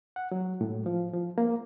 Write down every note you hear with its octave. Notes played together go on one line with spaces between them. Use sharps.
F#5
F#3
A2
F3
F3
A#3